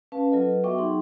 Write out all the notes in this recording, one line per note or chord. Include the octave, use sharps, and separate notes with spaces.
C#4 B4 F5 A5
F#3 F4 A4 B4 D#5
B3 F#4 E5 G5 C#6 D6
F#3 D#4 G#4 C6